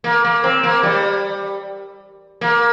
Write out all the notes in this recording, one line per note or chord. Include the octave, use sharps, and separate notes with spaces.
A#3
A#3
C4
A#3
G3
A#3